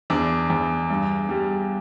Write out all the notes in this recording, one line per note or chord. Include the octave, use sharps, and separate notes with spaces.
E2 D4
E2
G2
G3